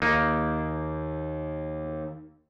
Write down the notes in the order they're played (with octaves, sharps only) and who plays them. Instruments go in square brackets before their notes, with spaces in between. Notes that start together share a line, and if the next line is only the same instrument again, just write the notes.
[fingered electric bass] D#2 [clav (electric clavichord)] A#3 D#4